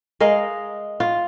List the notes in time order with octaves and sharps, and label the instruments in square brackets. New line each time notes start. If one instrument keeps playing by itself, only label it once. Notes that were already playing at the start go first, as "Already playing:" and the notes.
[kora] G#3 A#4 D#5 F5
F4